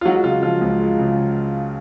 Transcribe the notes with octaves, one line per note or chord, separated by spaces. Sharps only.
F4
F#3 G#3 F#4
C#3 F4
F3 F4
C#2
G#3
C#3